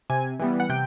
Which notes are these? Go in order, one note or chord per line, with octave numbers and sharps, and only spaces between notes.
C3 G#5
E3 G3 B3
F#5
C3 G5